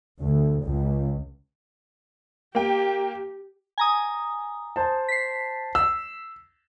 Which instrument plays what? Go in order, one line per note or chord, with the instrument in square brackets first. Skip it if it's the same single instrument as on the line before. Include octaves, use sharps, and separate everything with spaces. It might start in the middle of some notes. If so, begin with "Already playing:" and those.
[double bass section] D2
C#2
[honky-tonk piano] A#3 G5 [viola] G4
[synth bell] G#5 A#5 D#6
[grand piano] C5 A5
[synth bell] B6 C7
[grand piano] E6